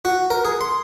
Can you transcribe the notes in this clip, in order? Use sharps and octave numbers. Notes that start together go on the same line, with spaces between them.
F#4
A#4
G#4
C6